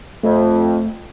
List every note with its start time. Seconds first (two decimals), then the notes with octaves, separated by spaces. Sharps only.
0.23 F2 A3